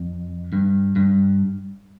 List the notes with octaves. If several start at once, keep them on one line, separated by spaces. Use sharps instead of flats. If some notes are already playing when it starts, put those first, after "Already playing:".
Already playing: F2
G2
G2